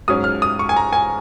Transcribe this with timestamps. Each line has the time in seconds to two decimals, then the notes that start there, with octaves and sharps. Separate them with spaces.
0.08 G#2 F#3 C#4 D#6
0.24 F6
0.42 D#6
0.59 C#6
0.69 G#5
0.76 A#5
0.93 G#5